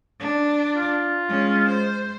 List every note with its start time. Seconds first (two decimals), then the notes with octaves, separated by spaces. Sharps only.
0.20 D4
0.77 F4
1.28 G#3 C#4
1.69 C5